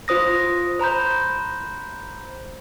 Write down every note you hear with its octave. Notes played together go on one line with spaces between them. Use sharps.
F4 C5 D#6 A#6
C5 A#5 B5 G6